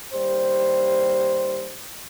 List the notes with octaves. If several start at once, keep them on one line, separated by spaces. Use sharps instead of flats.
D#2 G3 C5